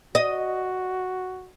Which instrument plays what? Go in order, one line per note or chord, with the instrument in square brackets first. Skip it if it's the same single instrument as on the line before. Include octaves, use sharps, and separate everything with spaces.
[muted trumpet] F#4 [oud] D#5